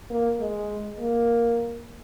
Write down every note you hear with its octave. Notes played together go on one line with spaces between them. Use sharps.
A#3
G#3
A#3